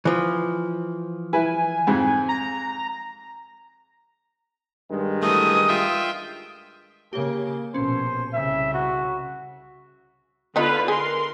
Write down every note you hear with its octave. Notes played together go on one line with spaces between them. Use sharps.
E3 F3
E4 B4 G#5
F2 G#2
A#5
G2 D#3 G#3
E3 A3 D#6
F4 E5 G5
C#3 A#3 G4 C#5
A#1 B2 C#4 C5
C2 C#3 E5
F#4
D3 B3 D4 D#4 F4 B4
G#4 A#4 C6